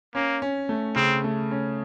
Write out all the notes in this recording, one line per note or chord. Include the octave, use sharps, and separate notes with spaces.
A#3 C#4
C#4
A3
C#3 C4
A3
C#4